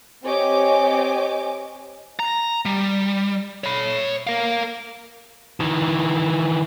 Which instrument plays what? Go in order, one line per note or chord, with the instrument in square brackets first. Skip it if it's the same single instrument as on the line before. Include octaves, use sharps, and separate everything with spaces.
[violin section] C4 G4 C#5 D#5 G#5 D6
[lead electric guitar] A#5
G3
C#5 B5
A#4 F5
[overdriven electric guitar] D#3 E3